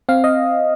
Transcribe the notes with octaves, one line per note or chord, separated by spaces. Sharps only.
C4 F5
D#5